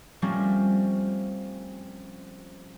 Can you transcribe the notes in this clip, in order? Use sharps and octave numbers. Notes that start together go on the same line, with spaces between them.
F3 G3 A3 A#3 C4 C#4